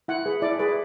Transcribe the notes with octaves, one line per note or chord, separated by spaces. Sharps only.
E4 F#5
G#4 B4
E4 D5
G#4 B4